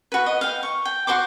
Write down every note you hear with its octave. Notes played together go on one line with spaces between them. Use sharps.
F#4 B4
D#5
F5 G5
C#6
G5
F#4 C5 C6 D6